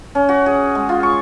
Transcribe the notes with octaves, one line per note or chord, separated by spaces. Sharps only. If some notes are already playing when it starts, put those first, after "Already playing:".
C#4
F#4
G#4
G#3
F4
C#6